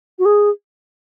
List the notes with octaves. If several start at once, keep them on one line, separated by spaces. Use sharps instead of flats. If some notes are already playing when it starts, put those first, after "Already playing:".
F#4
G#4